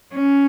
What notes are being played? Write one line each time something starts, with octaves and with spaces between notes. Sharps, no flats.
C#4